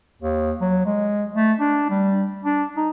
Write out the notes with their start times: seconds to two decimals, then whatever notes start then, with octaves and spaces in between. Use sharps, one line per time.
0.21 D#2
0.61 F#3
0.85 G#3
1.35 A3
1.60 D4
1.90 G3
2.44 D4
2.76 D#4